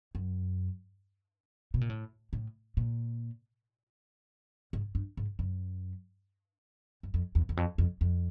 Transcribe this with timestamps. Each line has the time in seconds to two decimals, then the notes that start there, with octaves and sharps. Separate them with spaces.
0.15 F#2
1.74 B2
1.81 A#2
1.90 A2
2.33 A2
2.77 A#2
4.73 G#2
4.95 G2
5.17 G#2
5.39 F#2
7.03 F#2
7.14 F2
7.35 E2
7.49 E2
7.57 F2
7.78 F2
8.01 F2